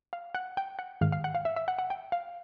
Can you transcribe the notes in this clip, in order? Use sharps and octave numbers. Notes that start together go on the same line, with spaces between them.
F5
F#5
G5
F#5
G#2 D#3 F5
F5
F#5
F5
E5
E5
F#5
F#5
G5
F5